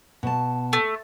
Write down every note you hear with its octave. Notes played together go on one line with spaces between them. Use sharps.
B2 A5
A3